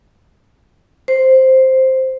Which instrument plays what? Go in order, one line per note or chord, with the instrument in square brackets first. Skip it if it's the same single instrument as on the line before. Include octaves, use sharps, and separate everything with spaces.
[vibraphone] C5